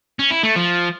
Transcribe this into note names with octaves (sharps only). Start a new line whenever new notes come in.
C#4
E4
A3
F3